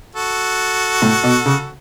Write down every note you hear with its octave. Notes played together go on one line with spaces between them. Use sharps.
F#4 A4
A2
B2
C#3